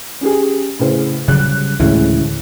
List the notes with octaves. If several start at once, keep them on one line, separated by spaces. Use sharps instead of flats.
C#4 G4 G#4
A2 C#3 C5
C#3 F#3 G3 F#6
D2 A2 C#3 E3 G#3 C#4 E4